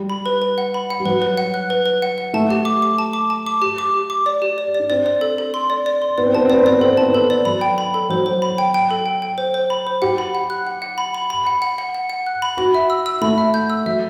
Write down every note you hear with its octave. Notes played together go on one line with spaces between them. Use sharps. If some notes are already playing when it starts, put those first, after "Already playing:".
Already playing: G3
B5
B4
B4
F#5
B5
F#5
G3
F#3 B4
B4
F#5
F#6
B4
B4
F#5
F#5
A3 A5
G4
D6
D6
A5
D6
A5
D6
G4
D6
G4
D6
D5
G4
D5
D4 D5
C4 D5
D5
A4
A4
C6
D5
D5
C6
B3 D5
C4
B3 A5
C4
B3 D5
C4 D5
B3
C4 A4
B3
C4 A5
B3
A4
D5
F#3 B5
G5
B5
A4
F#3 C5
C5
B5
G5
G5
A4
G5
G5
C5
C5
B5
C5
G4 F#5
B5
F#5
F#6
F#5
F#5
B5
B5
B5
F#5
F#5
F#5
F#5
F#5
F#6
B5
F#4 B5
E5
E6
E6
A3 B5
E5
G6
E6
F#3 E5